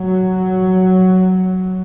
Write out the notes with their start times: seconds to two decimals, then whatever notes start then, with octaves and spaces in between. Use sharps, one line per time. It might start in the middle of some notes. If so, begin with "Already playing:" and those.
Already playing: F#3